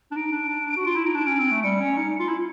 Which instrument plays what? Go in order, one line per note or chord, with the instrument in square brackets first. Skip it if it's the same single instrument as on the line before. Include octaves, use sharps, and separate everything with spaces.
[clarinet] D4
[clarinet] D#4 [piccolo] D7
[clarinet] D4
D4
F#4
F4
E4
D#4
[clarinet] D4 [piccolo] D7
[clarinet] C#4
C4
A3
[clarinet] G3 [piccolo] C#7
[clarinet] C#4
D#4
F4
E4